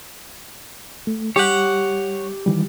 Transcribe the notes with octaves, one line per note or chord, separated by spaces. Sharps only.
A3
G3 G4 C#5 F#5
D#3 E3 G3